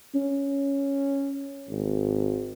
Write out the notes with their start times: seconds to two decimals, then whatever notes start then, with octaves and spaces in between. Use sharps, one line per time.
0.15 C#4
1.69 G#1